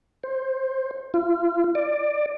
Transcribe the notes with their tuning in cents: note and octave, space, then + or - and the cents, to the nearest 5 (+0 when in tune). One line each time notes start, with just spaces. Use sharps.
C5 +15
F4 -35
D5 +20